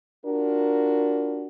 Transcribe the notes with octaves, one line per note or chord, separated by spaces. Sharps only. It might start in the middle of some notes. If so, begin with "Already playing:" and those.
D4 F4 F#4 A#4